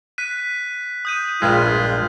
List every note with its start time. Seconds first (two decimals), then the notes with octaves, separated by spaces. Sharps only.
0.18 F#6 B6 D#7
1.05 D#6 G6 D#7
1.42 A#1 G2 G#3 F4 B6